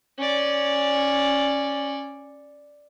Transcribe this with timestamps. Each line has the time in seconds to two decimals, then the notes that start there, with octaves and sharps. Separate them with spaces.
0.18 C#4 D5